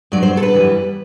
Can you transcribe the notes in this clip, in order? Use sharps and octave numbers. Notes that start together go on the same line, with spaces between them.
G2 F#3 D5
C5
A4
B4
F#2 E3 G3